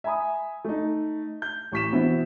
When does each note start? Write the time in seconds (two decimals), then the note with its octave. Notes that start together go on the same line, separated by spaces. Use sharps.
0.04 E5 G#5 A#5 B5 D#6
0.64 A3 D#4
1.42 G6
1.72 A1 C#6 B6 E7
1.92 B2 E3 B3 C4 E4